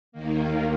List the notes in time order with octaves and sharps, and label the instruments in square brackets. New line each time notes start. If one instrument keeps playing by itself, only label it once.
[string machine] D#2 D#3 A#3